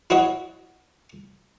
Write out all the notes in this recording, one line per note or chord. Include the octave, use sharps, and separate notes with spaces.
E4 F#4 C#5 D#5